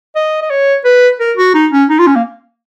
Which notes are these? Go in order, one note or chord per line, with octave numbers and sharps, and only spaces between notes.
D#5
D#5
C#5
B4
A#4
F#4
D#4
C#4
D#4
F4
C#4
A#3